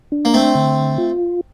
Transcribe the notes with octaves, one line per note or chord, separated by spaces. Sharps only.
D4
A#3
A3 C4
D3
F4